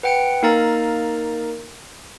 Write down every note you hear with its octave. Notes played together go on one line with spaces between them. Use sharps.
B4 F#5 G5 C#7 D7
A#3 D#4 A#4 F5 A#5 A6